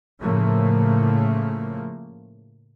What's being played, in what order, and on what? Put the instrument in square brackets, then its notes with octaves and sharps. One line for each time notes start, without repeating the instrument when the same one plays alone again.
[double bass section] A2 C#3 F3 A3 A#3